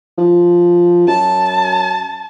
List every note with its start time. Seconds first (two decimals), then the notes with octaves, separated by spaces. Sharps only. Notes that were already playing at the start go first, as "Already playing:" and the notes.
0.18 F3
1.07 F#2 A5